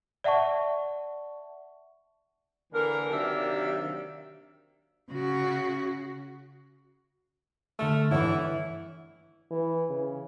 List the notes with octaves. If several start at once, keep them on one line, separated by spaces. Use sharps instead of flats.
D5 E5 F#5 A5 C#6
D3 E3 A#3 A#4
C3 D#3 F#3 A#3 D4 E5
C#3 F#4
D3 A3 A4 F6
D3 E3 E4 C#5
E3
C#3